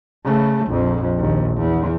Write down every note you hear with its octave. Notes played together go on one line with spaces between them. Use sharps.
C#3 A3
A#1 F2
A#1 D#2
E2